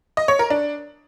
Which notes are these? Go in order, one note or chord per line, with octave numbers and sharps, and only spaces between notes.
D#5
C#5
A#4
D4